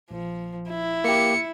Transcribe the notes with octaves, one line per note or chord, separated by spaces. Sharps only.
A#1 F3
E4
A#3 G4 C#7